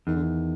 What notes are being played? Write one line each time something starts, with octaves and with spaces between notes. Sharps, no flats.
E2 D#3
D3
D#3